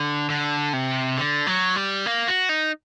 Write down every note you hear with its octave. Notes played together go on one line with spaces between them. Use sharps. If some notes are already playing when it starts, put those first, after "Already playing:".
Already playing: D3
D3
C3
D3
F#3
G3
A#3
F#4
D#4